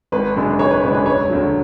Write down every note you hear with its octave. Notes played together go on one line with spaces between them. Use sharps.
G#1 B4
F#2 C#3 G#3 D4
G#1 C#5
B4
F#2 C#3 G#3 D4 C#5
B4
E1 C#5
D2 D3 F#3